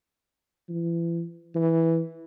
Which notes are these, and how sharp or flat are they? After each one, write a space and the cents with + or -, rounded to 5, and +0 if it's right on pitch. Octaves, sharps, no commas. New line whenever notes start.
E3 +35
E3 -5